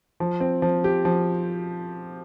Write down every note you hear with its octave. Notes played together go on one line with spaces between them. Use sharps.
F3
C4
F3
G4
F3